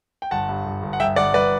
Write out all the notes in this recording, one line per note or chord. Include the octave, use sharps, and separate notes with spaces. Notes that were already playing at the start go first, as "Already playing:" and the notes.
G5
G1 F#5 A5
G2
G1
G1
F#5
G1 E5 G5
G1 D5 F#5
G1 B4 D5